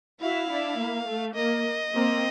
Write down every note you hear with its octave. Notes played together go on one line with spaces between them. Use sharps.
E4 F#4 F5
D4 E4
A#3
A3
A#3 D#5
A#3 C4